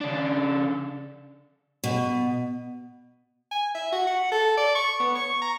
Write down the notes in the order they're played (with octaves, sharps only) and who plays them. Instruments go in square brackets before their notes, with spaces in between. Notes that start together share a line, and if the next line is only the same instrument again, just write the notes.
[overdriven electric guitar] C#3 D4
[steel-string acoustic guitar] B2
[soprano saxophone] G#5
E5
F#4
F#5
A4
D5
C#6
B3
C#6
A#5